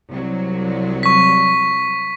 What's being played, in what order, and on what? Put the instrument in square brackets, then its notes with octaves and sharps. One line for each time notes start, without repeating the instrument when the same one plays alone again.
[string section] C2 F#3
[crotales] C#6 B6